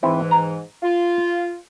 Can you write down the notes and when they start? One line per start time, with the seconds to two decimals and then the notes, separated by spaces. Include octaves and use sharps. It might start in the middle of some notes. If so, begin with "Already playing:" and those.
0.03 G#2 E3 C4 E4
0.31 A#5
0.83 F4